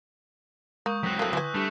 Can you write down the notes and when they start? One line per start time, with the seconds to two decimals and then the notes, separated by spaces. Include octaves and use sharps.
0.86 G#3 A#3 C#6 D#6 G6
1.03 F#3 C4 F#6 A#6 B6
1.19 A3 A#3 D#6 E6 F#6
1.33 D3 E3 B4 G#5
1.55 G3 A3 D4 G4